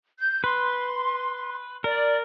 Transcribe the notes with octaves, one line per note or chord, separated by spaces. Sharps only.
G6
B4 C6
A#4 D5